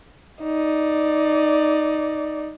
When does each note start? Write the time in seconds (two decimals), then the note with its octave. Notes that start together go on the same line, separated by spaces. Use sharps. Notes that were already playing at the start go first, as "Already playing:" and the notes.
0.43 D#4 D5